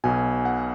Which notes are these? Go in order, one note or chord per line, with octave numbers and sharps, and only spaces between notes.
B1 B2 G#5
F#5